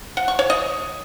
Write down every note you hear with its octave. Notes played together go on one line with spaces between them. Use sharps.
F#5
C#6
C#5
D#5